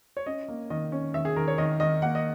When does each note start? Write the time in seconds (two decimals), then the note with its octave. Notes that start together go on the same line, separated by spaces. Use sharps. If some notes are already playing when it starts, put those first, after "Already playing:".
0.17 C#5
0.26 C#4 D#5
0.48 A#3
0.70 D#3 D#5
0.92 C#4
1.14 D#3 E5
1.25 G#4
1.36 D#3 A#4
1.48 C#5
1.58 D#3 D#5
1.80 D#3 D#5
2.02 A#3 F#5
2.15 D#5